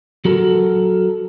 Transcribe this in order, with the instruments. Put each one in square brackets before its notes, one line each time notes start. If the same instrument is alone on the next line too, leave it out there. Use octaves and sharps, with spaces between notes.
[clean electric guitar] F#3 F#4 A4 A#4